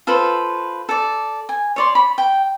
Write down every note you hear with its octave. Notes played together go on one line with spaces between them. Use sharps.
F4 A4 B4 C5
A4 D5
G#5
C#5 D5 C6
B5
G5